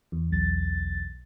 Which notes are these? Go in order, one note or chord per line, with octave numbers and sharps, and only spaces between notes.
E2
B1 A6